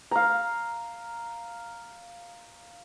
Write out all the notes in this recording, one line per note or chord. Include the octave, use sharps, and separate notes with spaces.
F5 A#5